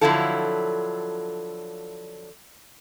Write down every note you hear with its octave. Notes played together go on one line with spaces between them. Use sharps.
D3 F3 F#3 E4 F4 A4